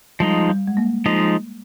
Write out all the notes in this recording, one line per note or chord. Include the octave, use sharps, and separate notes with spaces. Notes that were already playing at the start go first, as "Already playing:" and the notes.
F3 G3 G#3 D#4
G3
G#3
A#3
F3 G#3 D#4